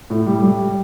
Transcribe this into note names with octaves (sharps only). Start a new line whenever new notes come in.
A2
G3
G3